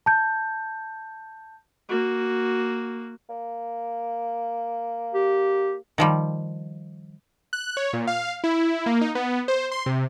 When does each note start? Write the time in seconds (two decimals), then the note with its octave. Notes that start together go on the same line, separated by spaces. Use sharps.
0.06 A5 G6
1.89 A#3 F#4
3.29 A#3
5.14 G4
5.98 D#3 F3 G3
7.53 F#6
7.77 C#5
7.93 A#2
8.07 F5
8.44 E4
8.86 A#3
9.01 D#4
9.15 B3
9.48 C5
9.71 C6
9.86 C3